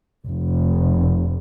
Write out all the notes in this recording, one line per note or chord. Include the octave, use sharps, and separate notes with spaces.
F1